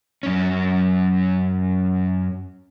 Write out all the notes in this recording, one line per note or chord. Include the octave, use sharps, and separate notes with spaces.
F#2 C#4